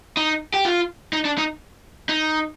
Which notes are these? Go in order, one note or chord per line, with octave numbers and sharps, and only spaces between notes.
D#4
G4
F4
D#4
D4
D#4
D#4